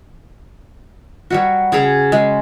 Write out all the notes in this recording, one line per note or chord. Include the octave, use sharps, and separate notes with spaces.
F#3 G3 F#4
C#3 G#4 C#5 A#5
G#3